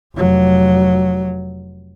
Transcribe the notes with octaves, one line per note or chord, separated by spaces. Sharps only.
F1 F#3